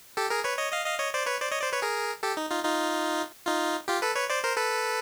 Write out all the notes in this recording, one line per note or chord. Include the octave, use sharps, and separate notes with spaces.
G4 A4
G#4 A#4
B4 C#5
C#5 D#5
D#5 F5
D#5 F5
C#5 D#5
C5 D5
B4 C#5
C5 D5
C#5 D#5
C5 D5
B4 C#5
G#4 A#4
G4 A4
D#4
D#4 F4
D#4 F4
D#4 F4
F4 G4
A4 B4
B4 C#5
C5 D5
A#4 C5
A4 B4